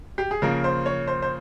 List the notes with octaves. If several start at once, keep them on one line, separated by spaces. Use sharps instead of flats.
G4
G#4
C#3 F3 A#3 A#4
C5
C#5
C5
C5